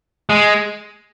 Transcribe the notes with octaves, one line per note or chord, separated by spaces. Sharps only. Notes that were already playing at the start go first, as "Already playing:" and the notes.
G#3